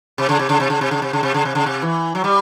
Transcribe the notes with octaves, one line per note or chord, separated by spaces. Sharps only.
C3
C#3
C3
C#3
C3
C#3
C3
C#3
C3
C#3
C3
C#3
C3
C#3
C3
E3
F#3
G3